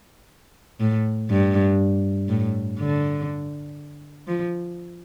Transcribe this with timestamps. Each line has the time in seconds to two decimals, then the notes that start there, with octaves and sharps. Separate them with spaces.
0.80 A2
1.31 G2
2.29 A2
2.79 D3
4.27 F3